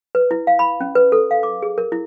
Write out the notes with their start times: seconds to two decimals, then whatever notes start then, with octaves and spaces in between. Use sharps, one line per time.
0.15 B4
0.31 E4
0.47 F5
0.59 B5
0.81 C#4
0.95 B4
1.12 A4
1.31 F5
1.43 D6
1.62 G#4
1.78 A#4
1.92 E4